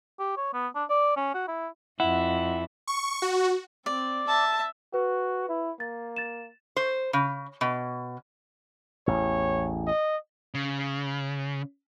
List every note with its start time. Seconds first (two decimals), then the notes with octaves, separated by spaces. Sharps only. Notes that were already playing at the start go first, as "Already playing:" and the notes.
0.19 G4
0.37 C#5
0.53 B3
0.75 D4
0.89 D5
1.16 C#4
1.34 F#4
1.48 E4
2.00 F2 E4 F#5
2.87 C#6
3.22 F#4
3.86 C4 D5
4.28 E5 A5
4.94 F#4 B4
5.49 E4
5.80 A#3 A6
6.16 A6 E7
6.76 C5
7.13 C#3
7.61 B2
9.07 A1 E2 C#5
9.87 D#5
10.54 C#3